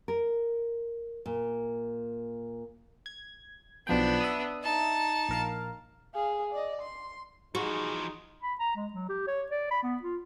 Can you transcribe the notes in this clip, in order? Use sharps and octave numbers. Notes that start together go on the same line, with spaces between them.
A#4
A#2
G#6
B1 F3 B3 D4 G5
E5 D#6
D#4 A5
A#1 A#4 F5
G#4 F5
D5 D#5
C6
E3 F3 D#4 F#4 G#4
B5
A#5
G#3
F#3
G4
C#5
D5
B5
B3
F4